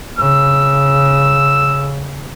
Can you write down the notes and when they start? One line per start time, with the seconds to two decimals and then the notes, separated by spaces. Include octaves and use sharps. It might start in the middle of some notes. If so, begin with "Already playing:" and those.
0.19 C#3 E6